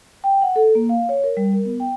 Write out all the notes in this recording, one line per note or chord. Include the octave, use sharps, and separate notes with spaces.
G5
F#5
A4
A#3
F5
C#5
A#4
G3
A#4
B3
G5